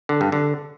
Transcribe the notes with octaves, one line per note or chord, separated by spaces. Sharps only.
D3
G2
D3